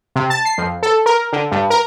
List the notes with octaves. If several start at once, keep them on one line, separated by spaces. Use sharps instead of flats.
C3
A5
C7
F2
A4
A#4
D3
G2
A#4